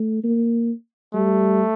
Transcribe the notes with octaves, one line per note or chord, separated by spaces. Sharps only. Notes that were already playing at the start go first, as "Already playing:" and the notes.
Already playing: A3
A#3
G3 A3